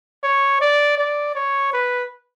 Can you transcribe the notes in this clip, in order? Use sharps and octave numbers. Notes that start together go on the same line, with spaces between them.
C#5
D5
D5
C#5
B4